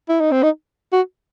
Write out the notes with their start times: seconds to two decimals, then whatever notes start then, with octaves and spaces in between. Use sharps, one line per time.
0.09 E4
0.21 D#4
0.32 C4
0.43 D#4
0.93 F#4